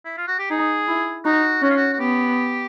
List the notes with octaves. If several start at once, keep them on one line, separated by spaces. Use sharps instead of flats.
E4
F4
F#4
G4
D#4 G#4
E4
D#4 F#4
C#4 F#4
F4
F#4
F#4
B3 G4